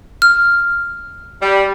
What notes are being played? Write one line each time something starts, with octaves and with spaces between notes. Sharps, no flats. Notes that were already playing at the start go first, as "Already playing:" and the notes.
F6
G3